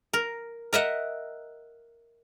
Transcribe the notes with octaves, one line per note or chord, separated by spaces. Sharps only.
A#4
A#4 D#5 E5 F#5